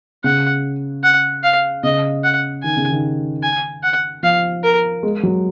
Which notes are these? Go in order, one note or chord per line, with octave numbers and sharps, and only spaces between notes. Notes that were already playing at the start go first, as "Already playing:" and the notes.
C#3 F#5
F#5
F5
C#3 D#5
F#5
D#3 G#5
C#3
D#3
G#5
F#5
F3 F5
A#4
G#3
F#3